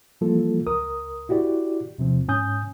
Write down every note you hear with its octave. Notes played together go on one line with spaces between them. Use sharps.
E3 F3 G3 A#3 F4 A4
C#2 A#4 D#6
E4 F#4 G4 D5
E2 C3 F3 C4
G#2 C#4 G#5 D#6 G6